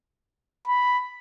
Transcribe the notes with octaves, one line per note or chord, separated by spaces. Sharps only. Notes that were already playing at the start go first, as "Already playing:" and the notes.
B5